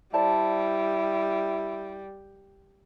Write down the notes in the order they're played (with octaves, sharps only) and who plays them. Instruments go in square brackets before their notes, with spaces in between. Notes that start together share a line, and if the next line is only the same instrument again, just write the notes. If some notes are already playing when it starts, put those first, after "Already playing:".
[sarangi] G3 [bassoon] E4 [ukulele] C5 D5 A5